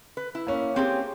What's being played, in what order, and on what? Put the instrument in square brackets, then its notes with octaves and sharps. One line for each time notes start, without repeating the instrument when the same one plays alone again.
[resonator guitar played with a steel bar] B4
E4
[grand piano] A#3 C#4
[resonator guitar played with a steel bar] C4 G4 G#4